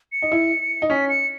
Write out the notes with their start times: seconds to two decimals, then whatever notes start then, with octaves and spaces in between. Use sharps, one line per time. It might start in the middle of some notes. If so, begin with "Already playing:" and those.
0.12 C#7
0.22 D#4
0.32 E4
0.82 D#4
0.90 C#4 B6
1.09 C#7